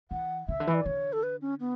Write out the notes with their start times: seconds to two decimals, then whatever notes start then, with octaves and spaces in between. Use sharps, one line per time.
0.11 E3 F#5
0.48 C#3 E5
0.60 D3
0.67 E3
0.74 D5
0.86 D3 C#5
1.13 A4
1.23 B4
1.41 C#4
1.60 B3